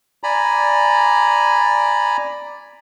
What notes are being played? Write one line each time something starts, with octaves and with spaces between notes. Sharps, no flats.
D5 G#5 A#5 B5